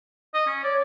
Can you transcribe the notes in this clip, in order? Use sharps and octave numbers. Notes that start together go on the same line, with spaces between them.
D#5
C#4
C#5 D5